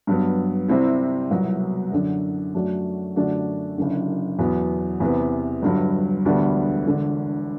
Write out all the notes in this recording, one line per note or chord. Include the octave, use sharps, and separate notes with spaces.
G2 F#3 B3
C2 C3 G3 C4 E4
C2 B2 F#3 B3 F#4
F#2 D3 F#3
F#2 F#3 A3 D4 F#4
F#2 D3 A3 D4 F#4
F#1 F#2 D3
E2 B2 F#3 B3
E2 C3 E3 B3
G1 G2 F#3
E1 D2 D3 G3 B3
E1 D2 D3